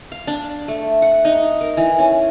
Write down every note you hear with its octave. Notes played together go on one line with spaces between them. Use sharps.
F5
D4
A3
F#5
D#4
A#4
E3
C#4